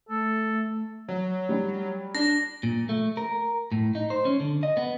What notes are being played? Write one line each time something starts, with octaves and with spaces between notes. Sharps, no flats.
A3 A4
F#3
G3
D4 A#6
A#2
A3
A#4
A2
D#4
C5
C#4
D3
D#5
B3